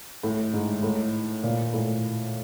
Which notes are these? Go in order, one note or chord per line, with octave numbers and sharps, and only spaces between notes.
A2
G#2
A2
A#2
A2